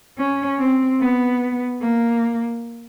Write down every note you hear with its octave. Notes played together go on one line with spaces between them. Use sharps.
C#4
C4
B3
A#3